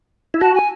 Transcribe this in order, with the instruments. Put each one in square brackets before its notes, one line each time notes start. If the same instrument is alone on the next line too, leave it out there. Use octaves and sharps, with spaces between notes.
[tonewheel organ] E4
[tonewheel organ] F#4 [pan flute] A5
[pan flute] G#5